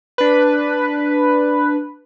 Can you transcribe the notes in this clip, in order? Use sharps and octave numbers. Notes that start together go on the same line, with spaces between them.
D4 B4